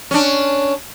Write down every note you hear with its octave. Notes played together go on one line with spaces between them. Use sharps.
C#4 D4